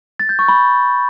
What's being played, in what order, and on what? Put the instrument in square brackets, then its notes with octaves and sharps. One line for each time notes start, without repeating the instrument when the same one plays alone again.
[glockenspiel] A6
G6
C#6
B5